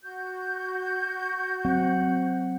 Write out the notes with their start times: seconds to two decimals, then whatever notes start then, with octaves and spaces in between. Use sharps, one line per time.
0.02 F#4 G6
1.65 F#3 C4 F#5